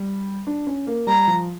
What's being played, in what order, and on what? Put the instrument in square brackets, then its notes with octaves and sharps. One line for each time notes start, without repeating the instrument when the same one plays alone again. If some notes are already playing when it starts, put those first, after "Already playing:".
Already playing: [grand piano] G3
D4
C#4
A#3
[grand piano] G3 [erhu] A#5
[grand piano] F3